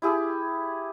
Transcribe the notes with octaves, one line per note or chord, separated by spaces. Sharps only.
E4 G4 G#4